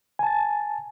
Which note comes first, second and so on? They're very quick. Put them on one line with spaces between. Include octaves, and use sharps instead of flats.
G#5 A5 A6